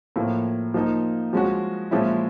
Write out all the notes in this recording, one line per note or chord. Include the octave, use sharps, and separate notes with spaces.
A2 F3 A#3
F3 A#3 D#4
F3 G#3 C#4 F#4
A#2 F3 G#3 C#4 E4